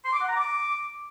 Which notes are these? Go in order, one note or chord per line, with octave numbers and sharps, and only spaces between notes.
C6
D6
F#5
A#5
D6